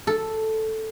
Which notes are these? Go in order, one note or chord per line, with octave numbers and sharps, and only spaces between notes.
A4